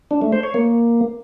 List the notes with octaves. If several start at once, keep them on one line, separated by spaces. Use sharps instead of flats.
D4
A3
C5
C#5
A#3